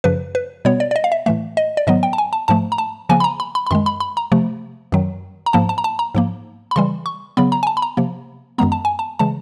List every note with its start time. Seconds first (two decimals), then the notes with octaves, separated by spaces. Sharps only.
0.04 F#2 C#3 F3 B4
0.35 B4
0.65 B2 G3 B3 C#5
0.80 D5
0.91 D5
0.96 D#5
1.04 F5
1.12 E5
1.26 A2 E3 A3 E5
1.57 D#5
1.77 D5
1.87 G#2 D#3 F#3 B3 D#5
2.03 G5
2.13 A5
2.18 G#5
2.33 A5
2.48 G#2 F3 A3 A5
2.72 A#5
2.78 A5
3.09 C#3 F3 A#3 G#5
3.20 B5
3.24 A#5
3.40 B5
3.55 B5
3.67 B5
3.71 F#2 D#3 G#3 C6
3.86 B5
4.00 B5
4.17 A#5
4.32 C3 F3 A3
4.92 F#2 D#3 F#3
5.46 A#5
5.53 G#2 F3 A#3 A5
5.69 A5
5.78 A#5
5.84 A5
5.99 A#5
6.15 G#2 F3 A#3
6.71 B5
6.76 C#3 E3 G3 C6
7.06 C#6
7.37 C#3 F#3 B3 B5
7.52 A#5
7.63 G#5
7.67 A5
7.77 B5
7.82 A#5
7.97 C3 F3 A#3
8.58 F#2 D#3 G#3 B3 A#5
8.72 A5
8.85 G#5
8.99 A5
9.19 C#3 E3 G#3 A5